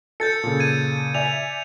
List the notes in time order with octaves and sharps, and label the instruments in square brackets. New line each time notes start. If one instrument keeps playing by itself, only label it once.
[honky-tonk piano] A4 [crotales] G6 A6 C#7
[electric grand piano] A#2 C#3
[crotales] G#6 D#7
[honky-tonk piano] D5 E5 G#5 [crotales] F7